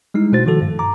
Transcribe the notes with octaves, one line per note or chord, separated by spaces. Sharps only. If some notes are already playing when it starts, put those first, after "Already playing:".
G3 G#3 D#4 E4
B2 A3 F#4 C5 A6
D#3 F3 F#4 A4
G2
A#5 D6